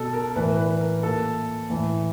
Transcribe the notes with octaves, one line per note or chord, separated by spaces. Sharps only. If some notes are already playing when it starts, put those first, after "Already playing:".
Already playing: B2 A4
A#4
A2 E3 B4
B4
B4
A#4
A#2 A4
A2 E3